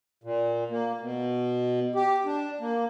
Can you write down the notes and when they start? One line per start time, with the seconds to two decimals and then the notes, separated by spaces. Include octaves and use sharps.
0.24 A#2
0.71 A#3
1.00 B2
1.95 G4
2.26 D4
2.60 A#3